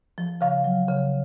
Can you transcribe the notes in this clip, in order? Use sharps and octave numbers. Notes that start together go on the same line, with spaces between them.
F3
C#3 F5
F#3
C#3